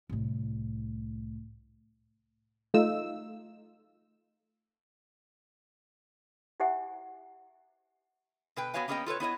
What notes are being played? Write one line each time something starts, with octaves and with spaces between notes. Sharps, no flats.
C2 A2
A3 D#4 F4 E6
E4 G4 C5 E5 F#5 G#5
B2 B4 G5
B3 F#4 B4 C#5 F5 G#5
A#3 B3 C#4 G#4 D#5 G5
F4 A4 B4 C#5
B3 E4 C#5 D#5